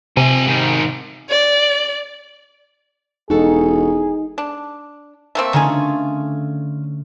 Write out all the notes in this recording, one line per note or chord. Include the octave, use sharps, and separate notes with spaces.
C3 C4 G#5
G#2 D#3
D5
E1 D#4 F#4 G#4 A4
D4
A3 A#3 C4
D3 D#3 A3 C#4 F4 G#4